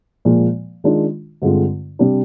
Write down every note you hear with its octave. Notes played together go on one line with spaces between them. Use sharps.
A#2 F3 G#3
D#3 G#3 D4 F4
G2 D3 G#3 C4 F4
C3 G3 D4